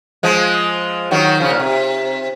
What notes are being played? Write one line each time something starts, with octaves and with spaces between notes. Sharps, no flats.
F3 G#3
D#3 F#3
C#3 F3
A#2
C3